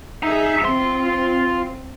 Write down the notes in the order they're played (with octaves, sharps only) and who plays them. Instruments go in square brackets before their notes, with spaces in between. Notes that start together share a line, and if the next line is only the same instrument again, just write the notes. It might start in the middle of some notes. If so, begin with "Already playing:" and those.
[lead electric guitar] D#4 [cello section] G#4 E5
[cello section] C4 [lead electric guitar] F4 C6